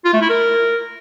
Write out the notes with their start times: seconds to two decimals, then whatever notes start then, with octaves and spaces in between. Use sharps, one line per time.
0.05 F4
0.13 A3
0.21 E4
0.30 A#4